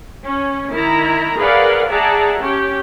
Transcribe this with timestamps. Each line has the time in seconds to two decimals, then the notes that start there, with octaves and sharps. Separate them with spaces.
0.24 C#4
0.71 D#3 E4 A#5
1.38 G#4 A#4 B4 D5 F5 F#5
1.89 G#4 D5 E5 F#5 A5 A#5
2.40 C#4 G4